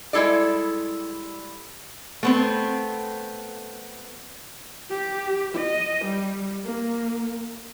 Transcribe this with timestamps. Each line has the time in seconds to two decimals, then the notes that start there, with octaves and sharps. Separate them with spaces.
0.13 G3 G#3 E4 A4 D5
2.23 A3 B3 C4
4.90 G4
5.55 D#5
6.05 G3
6.64 A#3